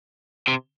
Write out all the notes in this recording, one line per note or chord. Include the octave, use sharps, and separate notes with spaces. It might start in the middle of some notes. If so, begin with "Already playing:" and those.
C3